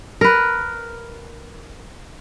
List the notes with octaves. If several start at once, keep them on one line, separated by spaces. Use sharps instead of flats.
A#4 B4